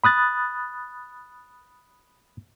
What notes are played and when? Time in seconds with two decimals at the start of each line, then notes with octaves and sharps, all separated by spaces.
0.04 B5 D#6 F#6 A6